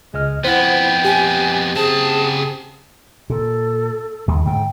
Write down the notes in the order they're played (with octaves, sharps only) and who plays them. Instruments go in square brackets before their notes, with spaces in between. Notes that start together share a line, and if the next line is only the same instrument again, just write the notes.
[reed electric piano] C#2 D#5 F6 [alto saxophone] G#3
[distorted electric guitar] F2 B3 [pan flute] E4 [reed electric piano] C5 F#5 [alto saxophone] G5
[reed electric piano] G4 [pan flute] G#5
[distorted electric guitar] C#3 A5 [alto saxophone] C4 [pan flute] G#4
[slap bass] A#2 [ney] A4
[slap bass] D#2 D#3 G3
[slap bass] G#2 D3 [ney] G5